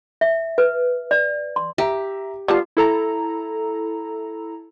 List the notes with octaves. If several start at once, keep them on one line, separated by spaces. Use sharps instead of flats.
E5
B4
D5
C6
G4 E5 A#5
G3 B3 F4 A5
E4 A4 A#5